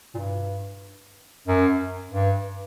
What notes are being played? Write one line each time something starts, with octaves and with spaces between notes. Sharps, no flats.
A#2
G2
F#2
G2